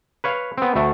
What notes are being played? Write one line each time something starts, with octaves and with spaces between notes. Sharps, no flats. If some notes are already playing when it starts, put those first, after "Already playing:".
B4 C#5 F5
B3 C4
D2 A3